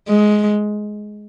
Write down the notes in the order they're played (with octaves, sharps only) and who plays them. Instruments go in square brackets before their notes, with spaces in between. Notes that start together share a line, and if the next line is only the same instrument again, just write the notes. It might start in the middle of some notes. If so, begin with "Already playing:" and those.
[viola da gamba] G#3